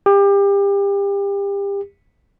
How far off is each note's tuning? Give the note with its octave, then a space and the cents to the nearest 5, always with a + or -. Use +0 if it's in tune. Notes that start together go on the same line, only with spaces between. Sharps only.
G4 +30